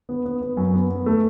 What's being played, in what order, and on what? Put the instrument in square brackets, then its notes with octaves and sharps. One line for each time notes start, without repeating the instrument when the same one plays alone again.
[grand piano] B3
B3
B3
F#2
B3
B3
A3